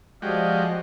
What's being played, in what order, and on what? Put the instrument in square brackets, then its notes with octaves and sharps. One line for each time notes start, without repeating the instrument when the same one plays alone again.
[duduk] F3 [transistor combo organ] G#3 F#4 G4 [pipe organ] D5 D#5 F5